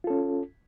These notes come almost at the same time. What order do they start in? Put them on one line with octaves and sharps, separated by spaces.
F4 A4 C#4